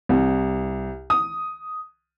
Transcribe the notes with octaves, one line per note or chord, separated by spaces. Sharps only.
C2
D#6